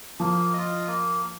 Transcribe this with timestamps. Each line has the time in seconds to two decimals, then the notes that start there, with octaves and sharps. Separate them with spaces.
0.20 F3 A#3
0.53 F4 D#5
0.87 A#3